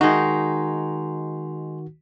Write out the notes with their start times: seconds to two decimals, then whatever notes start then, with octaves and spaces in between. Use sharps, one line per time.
0.01 D#3 G#3 D#4 F#4